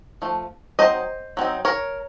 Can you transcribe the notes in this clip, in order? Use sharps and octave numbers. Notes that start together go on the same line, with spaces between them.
F3 A3
F#3 C4 D#4 C5 D#5
F#3 C4 D#4
A#4 C#5